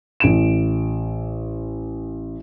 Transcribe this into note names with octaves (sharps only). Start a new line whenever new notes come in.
A1 D7 E7